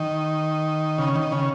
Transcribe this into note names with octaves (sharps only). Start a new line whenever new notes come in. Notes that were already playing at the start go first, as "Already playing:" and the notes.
Already playing: D#3
C#3
D#3
C#3